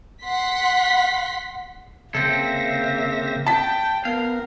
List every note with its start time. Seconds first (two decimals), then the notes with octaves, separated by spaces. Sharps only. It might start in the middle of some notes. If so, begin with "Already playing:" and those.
0.23 F#5 C6 B6
2.15 C#3 A#3 C4 A4 E5 A#6
3.46 G5 A5 B6
4.05 B3 A#4 F5